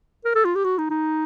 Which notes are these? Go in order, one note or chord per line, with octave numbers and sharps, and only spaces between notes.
A#4
A4
F4
G4
F#4
D#4
D#4